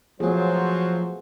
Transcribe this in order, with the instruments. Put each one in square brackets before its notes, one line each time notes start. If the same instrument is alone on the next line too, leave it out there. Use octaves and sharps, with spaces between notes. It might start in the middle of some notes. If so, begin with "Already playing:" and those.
[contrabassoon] F3 [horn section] F#3 [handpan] A3 B3 G#4 [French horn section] F4 F#4 C5